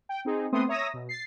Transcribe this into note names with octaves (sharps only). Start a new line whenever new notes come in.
G5
C4 D#4 G#4
A3 B3 C4 C6 D#6
C#5 E5 A#5 D#6 E6 A#6
B2
A6 C7